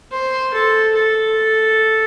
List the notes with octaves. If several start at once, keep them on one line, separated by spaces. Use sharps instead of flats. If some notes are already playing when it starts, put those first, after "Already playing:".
C5
A4
A4